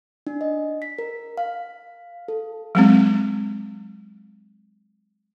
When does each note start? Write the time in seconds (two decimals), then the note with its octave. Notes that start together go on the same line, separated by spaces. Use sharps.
0.27 D4
0.41 D#5
0.82 B6
0.99 A#4
1.38 F5
2.28 A4
2.75 F#3 G#3 C4